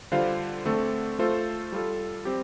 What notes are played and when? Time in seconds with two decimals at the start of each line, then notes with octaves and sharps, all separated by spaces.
0.12 D3 G3 F4 C5 F5
0.65 D3 A3 C4 A4
1.19 A3 F4 A4 C5
1.72 G3 F4 A4
2.25 G3 C4 G4